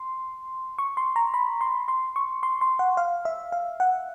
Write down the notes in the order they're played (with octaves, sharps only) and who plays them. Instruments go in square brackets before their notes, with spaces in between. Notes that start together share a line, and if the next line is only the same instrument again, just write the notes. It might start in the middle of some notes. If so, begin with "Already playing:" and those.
Already playing: [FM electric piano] C6
C#6
C6
A#5
B5
C6
C6
C#6
C6
C6
F#5
F5
E5
F5
F#5